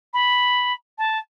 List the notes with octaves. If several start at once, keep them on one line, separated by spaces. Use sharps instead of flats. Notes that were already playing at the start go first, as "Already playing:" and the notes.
B5
A5